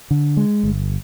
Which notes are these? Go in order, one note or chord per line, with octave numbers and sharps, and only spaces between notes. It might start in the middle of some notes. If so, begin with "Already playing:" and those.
D3
G#3
G1